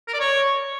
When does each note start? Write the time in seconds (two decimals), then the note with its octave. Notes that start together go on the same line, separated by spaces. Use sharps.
0.08 A#4
0.14 D5
0.20 C#5